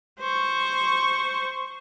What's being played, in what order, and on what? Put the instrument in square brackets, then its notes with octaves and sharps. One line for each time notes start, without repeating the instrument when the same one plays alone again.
[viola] C5 C#6